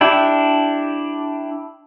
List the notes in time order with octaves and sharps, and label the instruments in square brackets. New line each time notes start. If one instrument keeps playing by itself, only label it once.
[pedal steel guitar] D4 E4 G4